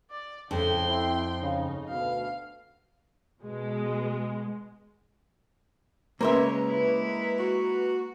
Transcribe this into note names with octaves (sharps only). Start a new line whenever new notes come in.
D5
F2 A2 C#3 G5 C6
C4 E4
C#3 D#4
D2 B2 F5
B2 G#3
C#3 G#3 A#3 C#4 B4 C5 E5 A#5
G#3 E4
F#4